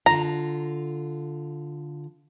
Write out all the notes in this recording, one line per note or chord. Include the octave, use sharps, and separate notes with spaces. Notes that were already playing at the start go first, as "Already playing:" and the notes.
D3 F4 A#5